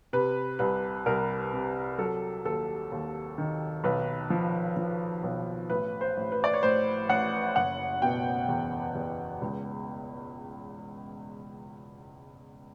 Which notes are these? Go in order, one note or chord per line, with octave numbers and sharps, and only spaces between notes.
C3 B4
C2 B4
C2 A#4
C3
F#3 A4
D#2 A4
D#2
D#3
B1 B4
F3
F3
B1
A1 B4
C5
A1
B4
D5
C#5
A2 C5
A1 F#5
F#1 F#5
B2 G5
E2
E2
C#2